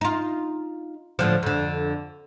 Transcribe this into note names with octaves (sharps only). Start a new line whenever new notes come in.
D#4 F4
A2 D3 F3
F2 D3